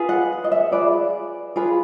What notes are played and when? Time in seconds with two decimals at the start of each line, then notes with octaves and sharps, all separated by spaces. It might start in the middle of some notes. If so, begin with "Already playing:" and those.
Already playing: F4 G#4 B4
0.09 F#5
0.44 D#5
0.52 E5
0.72 F4 G#4 B4 D5
1.56 F4 G#4 B4